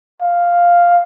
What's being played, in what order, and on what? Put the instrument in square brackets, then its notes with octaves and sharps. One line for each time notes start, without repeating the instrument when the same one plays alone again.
[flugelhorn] F5